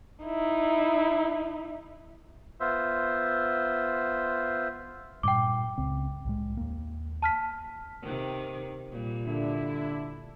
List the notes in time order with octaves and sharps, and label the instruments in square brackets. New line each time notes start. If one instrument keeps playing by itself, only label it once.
[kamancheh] D#4 E4
[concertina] B3 F4 C5 E5
[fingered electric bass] G2 A#2 G3 [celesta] G5 D6
[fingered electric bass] C#2 C#3 C4
C2 A2 G#3
D#2 A#3
[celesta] A5 F6 B6
[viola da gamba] C3 D#3
A#2 G3
[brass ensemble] D3 D4 E4